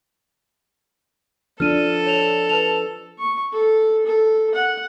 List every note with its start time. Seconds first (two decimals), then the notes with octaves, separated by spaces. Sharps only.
1.60 F3 D4 A4 F6 D#7
2.06 C#5 F7
2.49 B4 A5 F7
3.19 C#6
3.53 A4
4.06 A4
4.54 F#5